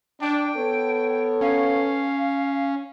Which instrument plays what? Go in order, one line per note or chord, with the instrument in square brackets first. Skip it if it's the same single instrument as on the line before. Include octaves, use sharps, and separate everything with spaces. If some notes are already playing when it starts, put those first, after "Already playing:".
[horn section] D4 [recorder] G5
[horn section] B3 A4 C#5
[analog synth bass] C#4 [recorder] F5